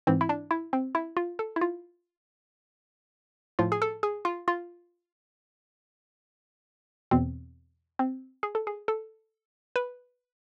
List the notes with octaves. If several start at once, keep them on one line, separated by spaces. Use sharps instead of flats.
G#2 E3 C4
E4
D4
E4
C4
E4
F4
A4
E4
F4
A2 F3 F4
G#4
A4
G#4
F4
F4
E2 B2 C4
C4
G#4
A4
G#4
A4
B4